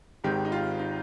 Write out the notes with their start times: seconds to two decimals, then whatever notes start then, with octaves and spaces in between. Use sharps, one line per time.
0.24 G#1 G#2 D#3 G4
0.45 D#4
0.52 F4
0.79 D#4